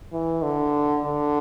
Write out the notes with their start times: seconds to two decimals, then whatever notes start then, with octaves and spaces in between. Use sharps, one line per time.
0.13 E3
0.42 D3
1.04 D3